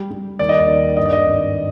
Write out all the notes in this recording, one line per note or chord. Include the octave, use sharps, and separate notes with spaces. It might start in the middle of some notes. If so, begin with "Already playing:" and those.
Already playing: G3
G3
D#2 D5
D#5
D5
D#2
G2 D#5
D5
D#5
G#1